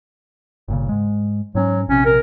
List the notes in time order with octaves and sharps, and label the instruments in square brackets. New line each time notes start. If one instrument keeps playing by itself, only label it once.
[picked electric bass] G1 A#2 C#3
G#2 G#3
[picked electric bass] G#2 C4 C#4 [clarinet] F#3
[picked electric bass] A#1 C3 [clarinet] C#4
[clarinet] A#4